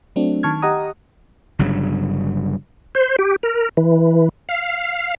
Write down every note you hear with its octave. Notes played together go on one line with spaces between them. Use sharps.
F#3 A3 C4 D4
D#3 A5 C#6 F6 G#6
G4 D#5 F#5 A#5 D#6
G1 G2 C#3 F#3
C5
G4
A#4
E3
F5